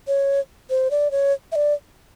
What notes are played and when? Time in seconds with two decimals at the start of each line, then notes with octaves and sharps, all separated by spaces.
0.08 C#5
0.70 C5
0.91 D5
1.11 C#5
1.52 E5
1.55 D5